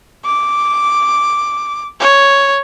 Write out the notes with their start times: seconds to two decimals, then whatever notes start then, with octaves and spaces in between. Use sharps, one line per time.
0.25 D6
2.00 C#5